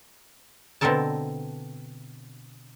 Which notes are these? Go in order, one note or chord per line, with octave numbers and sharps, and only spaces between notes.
B2 D3 C4 A4 A#4 A5